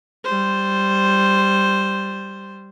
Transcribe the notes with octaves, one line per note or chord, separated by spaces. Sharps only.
G3 C5